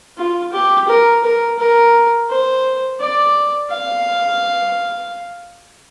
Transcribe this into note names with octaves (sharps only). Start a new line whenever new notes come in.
F4
G4
A#4
A#4
A#4
C5
D5
F5